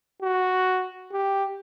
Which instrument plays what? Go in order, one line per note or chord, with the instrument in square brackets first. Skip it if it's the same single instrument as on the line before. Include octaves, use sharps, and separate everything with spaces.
[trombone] F#4
G4